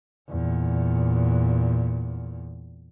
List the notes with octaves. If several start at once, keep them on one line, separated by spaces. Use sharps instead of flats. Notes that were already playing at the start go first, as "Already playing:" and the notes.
E2 A#2